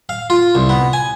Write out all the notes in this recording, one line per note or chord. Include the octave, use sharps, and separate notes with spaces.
F5
F4
C2
B3
G#5